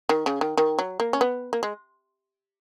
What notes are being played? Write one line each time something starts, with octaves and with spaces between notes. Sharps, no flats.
D#3
C#3
D#3
D#3
F#3
A#3
C#4
B3
A#3
G#3